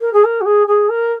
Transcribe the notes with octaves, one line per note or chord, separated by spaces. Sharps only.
A#4
G#4
A#4
F#4
G#4
G#4
A#4